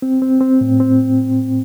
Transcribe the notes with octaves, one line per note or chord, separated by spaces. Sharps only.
C4
C4
C4
A2
C4